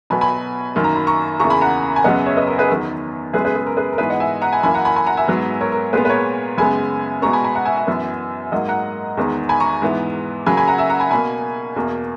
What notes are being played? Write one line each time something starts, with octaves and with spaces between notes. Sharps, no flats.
B2 F#3 B3 G#5 B5
G#5 B5
F#2 D#3 A#3
A#5
B5
A#5 C#6
E2 C#3 E3 A#3 A#5 C#6
G#5 B5
F#5 A#5
G#5
F#2 C#3 F#3 B3 D#5 F#5
C#5 E5
B4 D#5
A#4
G#4 B4
E2 D#3 F#3 B3
F#2 C#3 G#3 B3 G#4 B4
G#4 B4
G#4
A#4
G#4 B4
A#4
G#2 E3 B3 G#4 B4
D#5 F#5
E5 G#5
F#5 A#5
G#5 B5
F#2 E3 A#3 G#5 B5
F#5 A#5
G#5 B5
G#5 B5
F#5 A#5
E5 G#5
G#2 F#3 B3
A#4 C#5
A#4
A#2 G#3 B3 G#4 B4
B4
A#4 C#5
F#2 C#3 G#3 B3 G#5 B5
B2 G#3 B3 A#5 C#6
G#5 B5
G#5 B5
F#5 A#5
E5 G#5
E5 G#5
F#2 E3 B3
G#2 F#3 A#3 D#5 F#5
F#5 A#5
E2 D#3 G#3 B3
G#5 B5
A#5 C#6
G#2 E3 B3
C#3 F#3 A#3 G#5 B5
G#5 B5
F#5 A#5
E5 G#5
F#5 A#5
G#5 B5
B2 A#3 G#5 B5
E2 B2 A#3